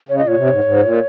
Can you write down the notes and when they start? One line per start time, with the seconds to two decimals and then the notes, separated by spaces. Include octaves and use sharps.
0.09 C#3 C#5
0.18 D#5
0.23 A#2 C#5
0.37 C3
0.50 G#2
0.64 G#2
0.83 A#2